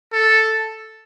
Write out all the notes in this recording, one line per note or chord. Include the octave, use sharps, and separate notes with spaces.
A4